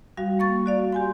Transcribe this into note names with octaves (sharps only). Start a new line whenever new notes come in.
G3 F#4 F5
A#3 C#6 A6
F#4 D5 F5
G4 G#5 C6